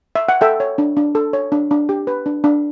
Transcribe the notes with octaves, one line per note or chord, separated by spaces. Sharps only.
E5
F#5
A4 E5 G5
C#5
D4
D4
A4
C#5
D4
D4
G4
B4
D4
D4